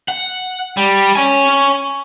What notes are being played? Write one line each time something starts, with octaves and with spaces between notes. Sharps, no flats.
F#5
G3
C#5 G#5